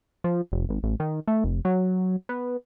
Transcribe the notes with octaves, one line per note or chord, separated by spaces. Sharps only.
F3
F1
G#1
A1
D#3
A3
F1
F#3
B3